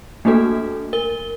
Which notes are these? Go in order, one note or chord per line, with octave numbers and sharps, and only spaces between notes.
A3 A#3 D4 F#4 A4
A#4 G7